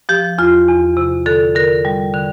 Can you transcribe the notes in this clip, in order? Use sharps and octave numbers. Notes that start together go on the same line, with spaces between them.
F3 G4
E2 F4
E2
C3
D3 A4
D3 A#4
G3
D3